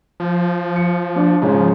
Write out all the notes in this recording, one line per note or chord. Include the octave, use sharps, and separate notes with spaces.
F3
C#7
D4
G#2 C#3 F3 C#4